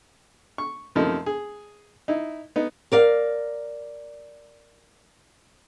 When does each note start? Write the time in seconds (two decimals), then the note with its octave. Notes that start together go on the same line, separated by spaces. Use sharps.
0.58 C#6
0.95 F#2 C3 F3 A3 A#3 D#4
1.26 G#4
2.08 D#4 E4
2.56 B3 D#4
2.92 A#4 D5 F5